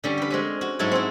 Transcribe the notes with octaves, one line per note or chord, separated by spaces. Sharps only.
D3 G3 C#4
G4 B4
G#3 C4 C#4
F#4
G#2 F#3 G#3 E4 A4 C#5
C4 E4